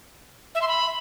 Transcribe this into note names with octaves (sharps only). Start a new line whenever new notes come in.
E5
C6
B5